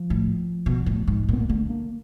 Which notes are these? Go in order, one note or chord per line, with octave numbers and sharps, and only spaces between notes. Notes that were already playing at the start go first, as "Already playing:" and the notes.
Already playing: F3
A2
B2
A2
G#2
A#2 B3
A#3
D3 A3
A#3